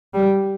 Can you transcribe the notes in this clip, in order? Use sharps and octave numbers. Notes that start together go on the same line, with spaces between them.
G3